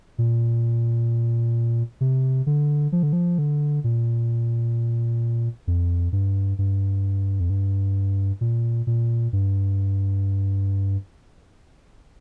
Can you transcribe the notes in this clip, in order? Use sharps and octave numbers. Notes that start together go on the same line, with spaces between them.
A#2
C3
D3
F3
D3
F3
D3
A#2
F2
G2
G2
F2
G2
A#2
A#2
G2